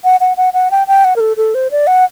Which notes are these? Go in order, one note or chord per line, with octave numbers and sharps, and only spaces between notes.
F#5
F#5
F#5
F#5
G5
G5
F#5
A#4
A4
A4
C5
D5
F#5